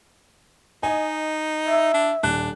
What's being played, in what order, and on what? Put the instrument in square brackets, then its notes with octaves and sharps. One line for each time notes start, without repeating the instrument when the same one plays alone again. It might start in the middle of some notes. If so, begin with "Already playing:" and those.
[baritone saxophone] D#4 [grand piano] D#5 G#5
[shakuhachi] E5
[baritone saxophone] D4
[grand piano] D#1 F#6 [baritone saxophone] D4